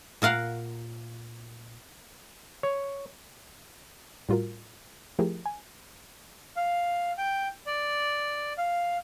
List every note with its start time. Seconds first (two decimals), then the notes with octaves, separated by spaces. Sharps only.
0.22 A#2 A#4 F5 F#5
2.63 C#5
4.29 A2 G3 F4 F#4 A#4
5.19 F3 A3 E4 G4 G#4 A#4
5.46 G#5
6.57 F5
7.18 G5
7.66 D5
8.58 F5